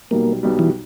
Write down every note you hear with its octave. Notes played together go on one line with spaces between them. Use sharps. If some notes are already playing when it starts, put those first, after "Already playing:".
B1 B2 G3 A#3
B1 B2 G3
E3